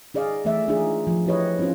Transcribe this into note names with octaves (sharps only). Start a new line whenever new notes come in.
D#4 G#4 D5 D#5 F5
E3 A3 D5 E5
D4 D#4 F4 G#4
F3
E4 G4 B4 C#5 D#5
C4 C#4 D#4 F4 C5